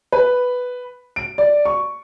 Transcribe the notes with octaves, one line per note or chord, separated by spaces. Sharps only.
B4
D7
D5
C#6